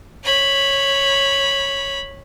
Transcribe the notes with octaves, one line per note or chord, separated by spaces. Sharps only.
C#5 B5